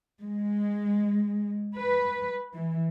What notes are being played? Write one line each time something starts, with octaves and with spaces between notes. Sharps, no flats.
G#3
B4
E3